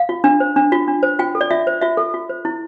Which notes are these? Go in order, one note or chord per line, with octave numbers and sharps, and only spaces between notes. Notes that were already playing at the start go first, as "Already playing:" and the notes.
Already playing: F5
F4
D4
C5
D4
F4
D4
C5
F4 G5
A4
D5
F4 E5
C5
F4 E5
A4
F4
C5
E4